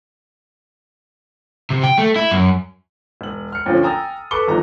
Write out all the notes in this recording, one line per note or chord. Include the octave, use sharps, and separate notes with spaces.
C3
G5
A3
E4
F#2
E1 F#7
F6 C#7
D2 F3 C4 C#4 F4
G5 G#5 A#5 D#6 E6 A6
A4 B4 C#6 D6 C#7 G7
G1 E2 D#3 F3 A#5